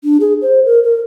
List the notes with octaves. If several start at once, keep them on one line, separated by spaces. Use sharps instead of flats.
D4
G#4
C5
A#4
A#4